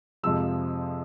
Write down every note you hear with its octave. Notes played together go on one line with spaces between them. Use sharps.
F2 C3 F3 G#3 E6